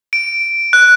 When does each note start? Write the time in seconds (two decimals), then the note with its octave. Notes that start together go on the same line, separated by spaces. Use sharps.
0.13 D7
0.73 F#6